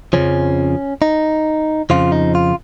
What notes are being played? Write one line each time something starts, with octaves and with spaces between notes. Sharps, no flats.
F2 C#3 F3 C#4
D#4
F2 C#3 F3 F4
D#4
F4